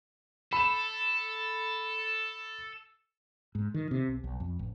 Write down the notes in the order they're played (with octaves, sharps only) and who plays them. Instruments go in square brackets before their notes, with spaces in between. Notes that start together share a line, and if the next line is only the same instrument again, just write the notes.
[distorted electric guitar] A4 [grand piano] B5 E7
[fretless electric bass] G#2
D#3
C3
B1
B1
F2
A1